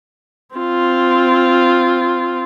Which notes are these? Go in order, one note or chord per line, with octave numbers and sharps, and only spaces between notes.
C4 F4